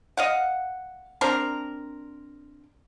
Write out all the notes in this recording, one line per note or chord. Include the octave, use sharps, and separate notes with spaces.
D#5 F5 F#5
C4 D4 A#4